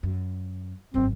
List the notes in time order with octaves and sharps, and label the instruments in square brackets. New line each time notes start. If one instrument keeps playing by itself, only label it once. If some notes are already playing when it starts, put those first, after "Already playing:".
[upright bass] F#2
[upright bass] G#1 F#2 [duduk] C4